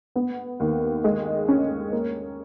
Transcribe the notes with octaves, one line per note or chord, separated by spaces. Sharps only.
B3
D#2
G#3
C#4
A#3